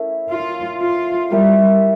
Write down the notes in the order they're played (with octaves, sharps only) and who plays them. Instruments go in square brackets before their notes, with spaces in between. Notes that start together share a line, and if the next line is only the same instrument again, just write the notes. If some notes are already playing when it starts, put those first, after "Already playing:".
Already playing: [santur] A3 C#4 E4 A#4
[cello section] F4
F4
[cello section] G3 [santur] E4 G4 A#4 E5